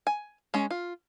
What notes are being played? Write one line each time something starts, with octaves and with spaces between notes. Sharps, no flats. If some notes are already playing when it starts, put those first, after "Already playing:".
G#5
G#3 C#4
F4